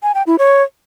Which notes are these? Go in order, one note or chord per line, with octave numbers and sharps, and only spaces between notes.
G#5
G5
E4
C#5